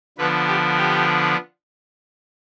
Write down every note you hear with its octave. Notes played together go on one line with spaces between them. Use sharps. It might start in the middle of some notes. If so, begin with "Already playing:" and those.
D3 F3 B3 D4 B4
G4
G4